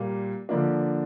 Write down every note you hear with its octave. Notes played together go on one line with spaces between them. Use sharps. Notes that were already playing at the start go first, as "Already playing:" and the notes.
Already playing: A#2 G3 A#3
D3 F3 A#3 D4